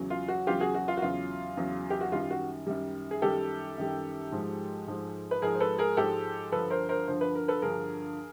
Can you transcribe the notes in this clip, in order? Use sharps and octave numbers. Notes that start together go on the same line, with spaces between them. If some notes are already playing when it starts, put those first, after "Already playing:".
Already playing: E2 C#3 F#3
F4
F#4
E2 C#3 F#3 F4 G4
F#4 G#4
F#4
F4
F#4
E2 C#3 F#3 F4
E2 C#3 F#3
G4
F#4
F#2 D#3 G3 F4
F#4
F#2 D#3 G3
G#4
F#2 D#3 G3 G4 A4
F#2 D#3 G3
G#2 F3 G#3
G#2 F3 G#3
B4
G#2 F3 G#3 G#4 A#4
C5
A4 B4
G#4 A#4
G#2 F3 G#3 G4 A4
G2 D3 F3 A4 B4
A#4 C5
A#4 C5
G2 D3 F3 C5
B4
A#4
A4 B4
G2 D3 F3 G#4 A#4